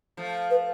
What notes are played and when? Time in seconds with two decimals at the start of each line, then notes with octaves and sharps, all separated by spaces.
0.17 F3 A3
0.51 B4